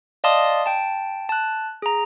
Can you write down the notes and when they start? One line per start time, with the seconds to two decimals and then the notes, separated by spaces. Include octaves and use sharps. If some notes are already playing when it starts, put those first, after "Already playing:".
0.24 D5 D#5 F5 A5 C6 D#6
0.66 G5 A5
1.29 A5 F#6
1.82 G#4 A#5